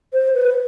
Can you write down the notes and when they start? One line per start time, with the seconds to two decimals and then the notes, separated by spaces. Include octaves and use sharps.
0.13 C5
0.35 B4